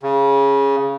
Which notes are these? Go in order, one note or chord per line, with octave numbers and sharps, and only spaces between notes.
C#3